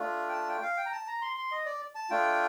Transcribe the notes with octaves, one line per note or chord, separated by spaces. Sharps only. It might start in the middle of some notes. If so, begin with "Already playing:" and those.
Already playing: A3 D4 F4
G5
A5
G5
F5
G5
A#5
A5
A#5
C6
C6
D#5
D5
A5
A3 D4 F4 G5